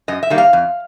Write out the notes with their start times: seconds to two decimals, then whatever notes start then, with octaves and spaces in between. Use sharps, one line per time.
0.08 F#2 D#5
0.23 E5
0.30 D#3 G3 A#3
0.38 F5
0.53 F2